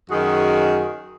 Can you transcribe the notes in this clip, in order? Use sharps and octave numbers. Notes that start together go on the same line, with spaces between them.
F#2 D#3 F#4 G#4